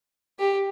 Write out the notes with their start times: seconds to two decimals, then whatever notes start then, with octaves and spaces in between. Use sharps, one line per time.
0.39 G4